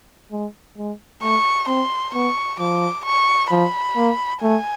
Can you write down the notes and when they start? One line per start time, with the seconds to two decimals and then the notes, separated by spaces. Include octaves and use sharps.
0.32 G#3
0.78 G#3
1.23 A3 C#6
1.68 C4 C6
2.14 B3 C#6
2.60 F3 D6
3.06 C#6
3.51 F3 B5
3.97 A#3
4.43 A3 G#5